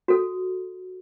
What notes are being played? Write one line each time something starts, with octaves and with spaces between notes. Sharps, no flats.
F#4 A4